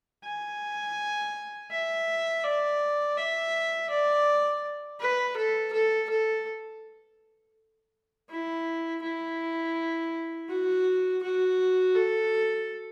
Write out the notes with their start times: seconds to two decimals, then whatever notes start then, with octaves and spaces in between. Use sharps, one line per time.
0.24 G#5
1.71 E5
2.44 D5
3.17 E5
3.90 D5
5.00 B4
5.37 A4
5.73 A4
6.09 A4
8.30 E4
9.02 E4
10.49 F#4
11.22 F#4
11.95 A4